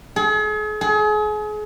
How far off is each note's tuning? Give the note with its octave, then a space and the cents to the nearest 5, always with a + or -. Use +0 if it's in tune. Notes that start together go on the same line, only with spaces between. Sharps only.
G#4 +40
G#4 +35